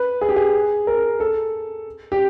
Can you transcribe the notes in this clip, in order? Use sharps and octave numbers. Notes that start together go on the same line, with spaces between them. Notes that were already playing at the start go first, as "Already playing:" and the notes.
Already playing: B4
G#4
G4
G#4
A#4
A4
G4